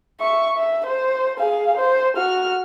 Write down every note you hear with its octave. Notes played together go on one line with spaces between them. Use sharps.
E5 C#6
E5
C5
G#4 F5
C5
F#4 F6